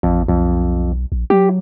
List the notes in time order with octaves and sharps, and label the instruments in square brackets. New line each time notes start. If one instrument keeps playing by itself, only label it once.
[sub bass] A1 [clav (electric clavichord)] F2
[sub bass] B1 [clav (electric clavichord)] F2
[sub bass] A#1
[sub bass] F#3 [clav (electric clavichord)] G4